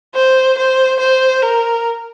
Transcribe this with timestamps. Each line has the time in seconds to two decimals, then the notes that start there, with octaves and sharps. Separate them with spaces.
0.15 C5
0.58 C5
0.99 C5
1.42 A#4